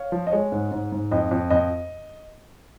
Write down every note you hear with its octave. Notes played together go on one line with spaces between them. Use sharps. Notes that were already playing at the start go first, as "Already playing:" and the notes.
Already playing: C#5 F5
F3
D#5
G#3 C#5
G#2
G#2
G#2
F2 D#5
F2
F2 D#5